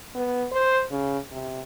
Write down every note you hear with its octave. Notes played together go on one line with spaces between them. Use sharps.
B3
C5
C#3
C3